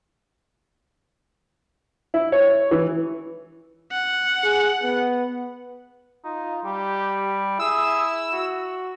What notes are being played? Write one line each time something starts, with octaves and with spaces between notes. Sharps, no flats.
E4
C#5
E3
F#5
G#4
B3
D#4 F4
G3 G4
E4 G#4 E6
F#4